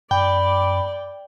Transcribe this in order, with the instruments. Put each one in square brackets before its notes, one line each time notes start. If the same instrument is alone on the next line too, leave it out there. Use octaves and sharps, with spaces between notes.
[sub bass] F#2 [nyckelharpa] D5 D6 [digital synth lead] G5 [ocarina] B5